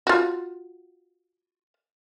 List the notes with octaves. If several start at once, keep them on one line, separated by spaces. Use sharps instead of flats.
F4 F#4